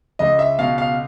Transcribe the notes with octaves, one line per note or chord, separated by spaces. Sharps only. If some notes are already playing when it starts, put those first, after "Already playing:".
C#2 D#5
E5
B2 F5
F5